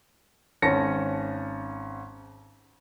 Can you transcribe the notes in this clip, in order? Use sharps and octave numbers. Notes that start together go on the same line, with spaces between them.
G#1 C#4 A5 A#6 C#7